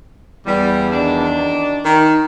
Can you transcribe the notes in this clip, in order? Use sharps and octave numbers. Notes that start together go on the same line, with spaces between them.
E2 G3
F#2 D#3 D4
D#3